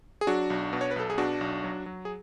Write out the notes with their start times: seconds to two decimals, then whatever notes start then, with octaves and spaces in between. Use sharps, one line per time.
0.21 G#4
0.27 F#3 D4 F#4
0.50 B1
0.73 B2
0.81 C#5
0.91 B4
0.96 B1 A4
1.10 G#4
1.18 B2 D4 F#4
1.41 B1
1.64 F#3
1.86 F#3
2.05 G#4